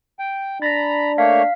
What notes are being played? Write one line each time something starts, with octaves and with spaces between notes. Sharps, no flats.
G5
D4 A#5 B5 A6 A#6
A3 A#3 C#5 F5 B6